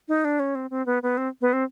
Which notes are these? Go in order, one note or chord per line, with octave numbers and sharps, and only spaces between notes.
D#4
D4
C#4
C4
C4
B3
B3
C4
B3
C4